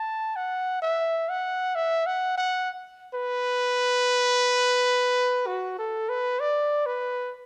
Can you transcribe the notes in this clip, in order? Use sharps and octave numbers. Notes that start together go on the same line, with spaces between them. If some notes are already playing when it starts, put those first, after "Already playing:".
Already playing: A5
F#5
E5
F#5
E5
F#5
F#5
B4
F#4
A4
B4
D5
B4